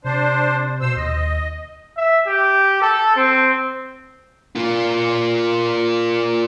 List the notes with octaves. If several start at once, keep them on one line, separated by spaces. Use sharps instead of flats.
C3 D4 C5
B2 C5 E6
D#2 D#5
E5
G4
A4
C4
A#3 F4